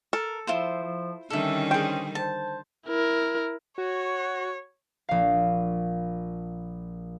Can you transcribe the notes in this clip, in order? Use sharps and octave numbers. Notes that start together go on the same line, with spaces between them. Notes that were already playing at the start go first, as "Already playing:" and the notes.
A4 A#4
F3 E4 F4 C5
F3
D3 D#3 G3 C#4 A4 E5
G#4 C5 G5
C5 A5
E4 A#4
F#4 C#5
A#1 F5